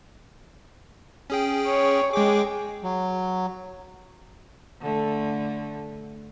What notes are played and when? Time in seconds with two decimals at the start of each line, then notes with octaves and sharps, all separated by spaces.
1.30 C#4 G#4 G5
1.67 C#5
2.13 G#3 G#4 G5 D6
2.83 F#3
4.81 D3 A3